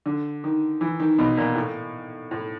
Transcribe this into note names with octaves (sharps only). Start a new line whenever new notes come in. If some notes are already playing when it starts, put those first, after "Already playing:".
D3
D#3
E3
D#3
B2
A#2
A2
A2